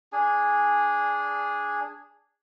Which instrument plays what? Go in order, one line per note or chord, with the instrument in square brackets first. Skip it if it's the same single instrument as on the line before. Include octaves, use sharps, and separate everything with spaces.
[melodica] D4 G#4 G#5